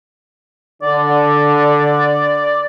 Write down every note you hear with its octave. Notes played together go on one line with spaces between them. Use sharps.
D3 D5